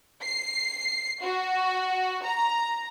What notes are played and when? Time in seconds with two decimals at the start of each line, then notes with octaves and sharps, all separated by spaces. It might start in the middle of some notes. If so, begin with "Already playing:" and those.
0.22 C7
1.22 F#4
2.25 A#5